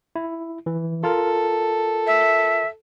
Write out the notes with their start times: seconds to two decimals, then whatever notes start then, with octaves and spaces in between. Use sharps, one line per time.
0.16 E4
0.66 E3
1.04 F4 A4 A#4
2.07 E5